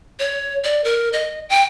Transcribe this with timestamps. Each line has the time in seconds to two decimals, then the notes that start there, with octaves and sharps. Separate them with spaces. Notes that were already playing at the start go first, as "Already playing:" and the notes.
0.19 C#5
0.64 D5
0.84 A#4
1.13 D#5
1.49 G5